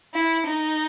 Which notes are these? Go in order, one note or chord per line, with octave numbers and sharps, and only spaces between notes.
E4
D#4